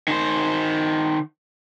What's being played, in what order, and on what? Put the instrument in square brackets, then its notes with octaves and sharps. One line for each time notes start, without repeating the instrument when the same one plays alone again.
[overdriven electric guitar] D#3 C5